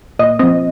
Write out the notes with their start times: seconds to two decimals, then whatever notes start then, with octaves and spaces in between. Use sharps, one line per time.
0.19 A#2 D#5
0.39 F3 C4 D#5